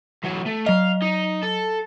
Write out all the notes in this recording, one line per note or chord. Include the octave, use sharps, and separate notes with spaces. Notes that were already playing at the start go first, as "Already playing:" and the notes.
E3 F#3
A3
F#3 D#5 F5
D#4
A4